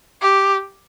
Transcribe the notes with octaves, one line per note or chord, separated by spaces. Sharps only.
G4